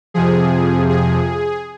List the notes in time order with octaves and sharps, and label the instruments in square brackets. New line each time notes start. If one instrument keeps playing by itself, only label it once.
[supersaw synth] F2 C3 F3 G#4
G#4